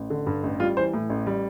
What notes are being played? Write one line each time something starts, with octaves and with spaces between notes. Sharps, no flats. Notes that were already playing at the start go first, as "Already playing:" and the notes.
Already playing: A1
D3
G2
A1
G3 F4
E3 C5
A2
A1
G3